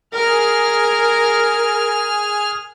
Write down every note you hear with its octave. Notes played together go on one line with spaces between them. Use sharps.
G#4 A#4 F6